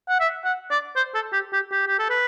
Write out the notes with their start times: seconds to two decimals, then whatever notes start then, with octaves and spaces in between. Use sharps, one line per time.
0.09 F#5
0.20 E5
0.44 F#5
0.71 D5
0.96 C5
1.14 A4
1.33 G4
1.53 G4
1.71 G4
1.87 G4
1.99 A4
2.09 B4